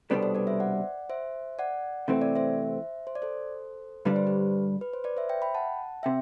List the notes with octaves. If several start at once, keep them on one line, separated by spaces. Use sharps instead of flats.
C2 B2 G3 B3 D4 A4 C5
A4 C5
B4 D5
C5 E5
D5 F#5
C5 E5
D5 F#5
C3 E3 A3 C4 E5
D5
C5 E5
C5
D5
A4 C5
G2 D3 G3 D4 B4
C5
G4 B4
B4
C5
B4 D5
C5 E5
E5 G5
G5 B5
F#5 A5
C3 E5 G5